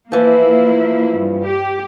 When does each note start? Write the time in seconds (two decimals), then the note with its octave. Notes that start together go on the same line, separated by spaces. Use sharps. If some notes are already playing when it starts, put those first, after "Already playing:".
0.12 E3 F3 A#3 E4
1.16 G2
1.44 G4